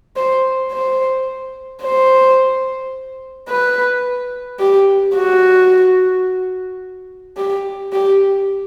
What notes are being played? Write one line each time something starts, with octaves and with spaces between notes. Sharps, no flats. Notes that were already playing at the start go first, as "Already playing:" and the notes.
C5
C5
C5
B4
G4
F#4
G4
G4